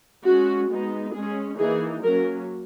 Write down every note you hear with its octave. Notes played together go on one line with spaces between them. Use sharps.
G#3 C#4 F#4
G#3 B3 D#4
G#3 C#4 G#4
E3 A#3 D#4 G#4
F#3 A#3 C#4 A#4